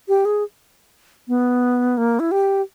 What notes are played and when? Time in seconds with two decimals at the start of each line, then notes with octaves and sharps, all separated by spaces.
0.08 G4
0.25 G#4
1.28 B3
1.97 A#3
2.20 E4
2.31 G4